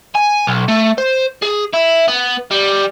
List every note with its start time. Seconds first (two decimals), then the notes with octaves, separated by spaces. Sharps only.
0.15 G#5
0.47 B1
0.68 A3
0.98 C5
1.42 G#4
1.73 E4
2.08 B3
2.51 G3